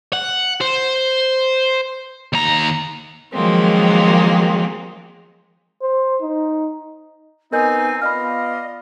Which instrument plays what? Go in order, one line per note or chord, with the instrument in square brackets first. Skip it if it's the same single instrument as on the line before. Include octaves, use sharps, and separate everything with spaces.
[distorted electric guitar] F#5
C5
D#2 A#5
[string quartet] D#3 F3 F#3 G#3 A#3 C4
[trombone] C5
D#4
[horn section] B3 D#4 [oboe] C4 [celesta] A#4 D#5 G6 [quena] G#5
[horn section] B3 F4 D5 [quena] D#5 [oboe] F5 [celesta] B5 F6